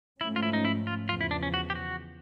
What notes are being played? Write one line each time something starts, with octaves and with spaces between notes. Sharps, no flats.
G#2 F3 A3 C#4 E4
F4
E4
D#4
E4
F4
E2 C#3 F3 F4
E4
D4
C#4
F#4
G4
F#4